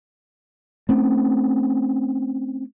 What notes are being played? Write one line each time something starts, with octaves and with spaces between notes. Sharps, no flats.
A3 C4 C#4